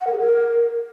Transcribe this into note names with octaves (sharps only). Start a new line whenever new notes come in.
F#5
A#4
G#4
A#4